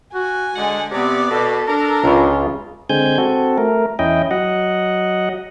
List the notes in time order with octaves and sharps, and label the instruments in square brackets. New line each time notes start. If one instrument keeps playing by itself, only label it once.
[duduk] F#4 [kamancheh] G#5
[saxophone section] D3 F#5 [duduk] G#3
[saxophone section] C3 [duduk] B3 [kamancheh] D5
[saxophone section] B2 [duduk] A4
[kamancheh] D4 [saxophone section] A#4
[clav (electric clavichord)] C#2 C#3 [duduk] F4
[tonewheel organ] D3 G#3 C4 G#5 G6
C4 F#4 A4
A3 A#4
E2 C#4 E4 D#5 G5
F#3 D#5 F#5